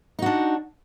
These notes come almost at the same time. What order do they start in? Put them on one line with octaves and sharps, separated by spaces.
D#4 F#4 D4